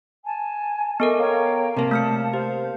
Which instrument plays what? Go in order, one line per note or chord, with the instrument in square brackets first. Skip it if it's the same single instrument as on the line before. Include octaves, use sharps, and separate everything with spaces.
[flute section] G#5 A5
[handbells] B3 A4 A#4 [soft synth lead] D#5
[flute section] C#5 G5 A#5 [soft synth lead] F5
[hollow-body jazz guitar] C3 A#3 [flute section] A5
[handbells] A3 F6 C#7
[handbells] G4 [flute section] C5 [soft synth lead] F5